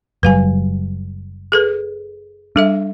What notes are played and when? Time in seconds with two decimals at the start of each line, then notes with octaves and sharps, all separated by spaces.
0.23 F#1 F#3 G3 B4 F5 G#5
1.52 G#4 A4 B4
2.56 G3 D4 A4 E5